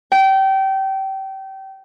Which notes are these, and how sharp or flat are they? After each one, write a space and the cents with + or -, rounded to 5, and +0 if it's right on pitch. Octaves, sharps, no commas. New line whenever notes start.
G5 -25